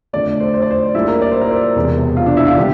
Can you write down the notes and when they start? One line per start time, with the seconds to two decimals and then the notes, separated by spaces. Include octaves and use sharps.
0.13 F2 D3 A3 D5
0.40 C5
0.54 C5
0.62 D5
0.71 C5
0.94 A#1 A#2 G3 A#3 E4
1.08 A#4
1.22 D5
1.32 C5
1.41 A#4
1.51 C5
1.76 E1 E2 C3
2.17 F4
2.26 D4
2.37 E4
2.47 F4
2.57 D3 G3 G4